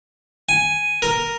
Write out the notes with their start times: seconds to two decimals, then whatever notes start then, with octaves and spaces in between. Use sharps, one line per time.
0.49 G#5
1.02 A#4